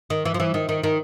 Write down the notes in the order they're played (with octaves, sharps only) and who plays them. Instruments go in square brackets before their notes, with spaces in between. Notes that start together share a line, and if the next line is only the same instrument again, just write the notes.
[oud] D#3
E3
F3
E3
D#3
D#3
D#3